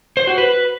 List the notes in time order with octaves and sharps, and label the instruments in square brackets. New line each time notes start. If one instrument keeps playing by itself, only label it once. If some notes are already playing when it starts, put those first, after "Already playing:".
[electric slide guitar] C5
F#4
B4